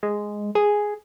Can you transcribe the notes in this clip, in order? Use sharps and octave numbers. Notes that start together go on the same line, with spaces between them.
G#3
G#4